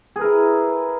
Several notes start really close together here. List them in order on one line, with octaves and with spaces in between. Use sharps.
G#4 B4 A#4 E4